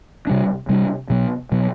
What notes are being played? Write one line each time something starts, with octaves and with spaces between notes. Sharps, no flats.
C3 G3 D4
C3 G3 D4
B2 F#3 B3
B2 F#3 B3